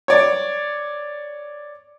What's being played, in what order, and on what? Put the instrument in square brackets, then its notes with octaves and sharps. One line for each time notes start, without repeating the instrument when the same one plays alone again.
[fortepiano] C#5 D5